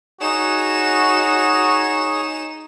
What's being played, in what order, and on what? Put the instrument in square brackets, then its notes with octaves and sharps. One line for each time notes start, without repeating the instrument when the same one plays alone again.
[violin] D#4 E7 [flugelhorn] F#4 [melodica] G#4 C#5